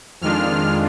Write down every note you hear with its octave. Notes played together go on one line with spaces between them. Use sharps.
F2 D#3 G#3 D4 F4 F6